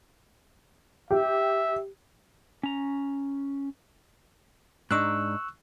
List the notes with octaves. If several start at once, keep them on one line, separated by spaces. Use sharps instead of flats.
G4 E5
C#4 A#5
G#2 D4 D#4 C#6 E6 F#6